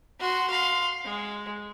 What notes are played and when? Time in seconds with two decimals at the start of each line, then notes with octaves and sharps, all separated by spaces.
0.20 F#4 C6
0.50 F5 C6
1.05 G#3